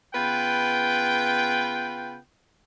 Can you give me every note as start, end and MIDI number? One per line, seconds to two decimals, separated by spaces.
0.15 2.18 49
0.15 2.18 59
0.15 2.18 65
0.15 2.18 71
0.15 2.18 79